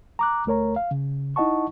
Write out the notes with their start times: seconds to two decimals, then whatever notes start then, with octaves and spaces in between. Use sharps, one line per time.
0.19 A#5 D6 F#6
0.46 D2 A3 A#4 C#5 A#5
0.76 F5
0.91 C#3
1.36 D#4 E4 D#5 F#5 A5 C#6